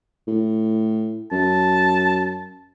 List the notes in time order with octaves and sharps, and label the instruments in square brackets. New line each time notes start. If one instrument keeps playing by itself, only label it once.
[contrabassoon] A2
[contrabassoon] F#2 [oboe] A5